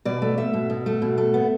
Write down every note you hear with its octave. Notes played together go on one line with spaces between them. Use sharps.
B2 D5
A3
A3 E5
B2
B2
A3
B2
A3
B3